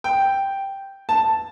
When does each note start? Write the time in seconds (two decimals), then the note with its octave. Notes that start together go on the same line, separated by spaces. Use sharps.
0.04 G5
1.09 A5